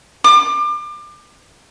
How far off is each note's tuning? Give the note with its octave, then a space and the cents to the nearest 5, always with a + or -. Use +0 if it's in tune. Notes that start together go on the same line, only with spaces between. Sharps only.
D6 +30